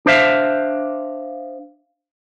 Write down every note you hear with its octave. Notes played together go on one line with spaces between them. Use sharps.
D4 C5 E5 F5